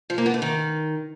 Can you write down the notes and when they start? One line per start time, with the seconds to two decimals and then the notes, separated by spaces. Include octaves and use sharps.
0.10 F3
0.18 A#3
0.26 B3
0.34 A3
0.42 D#3